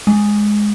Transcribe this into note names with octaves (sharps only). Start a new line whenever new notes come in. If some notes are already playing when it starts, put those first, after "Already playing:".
G#3